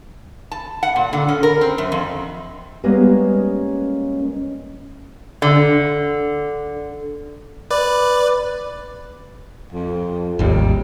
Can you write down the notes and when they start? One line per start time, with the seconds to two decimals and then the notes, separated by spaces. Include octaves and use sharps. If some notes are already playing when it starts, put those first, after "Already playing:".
0.51 A5
0.83 F#5
0.96 A#2
1.13 D3
1.29 C#4
1.43 A#4
1.61 C4
1.78 F#2
1.92 F2
2.84 G3 G#3 A#3 B3 C#4
5.42 D3
7.71 B4 D5
9.72 F2
10.39 G#1 D#2 G3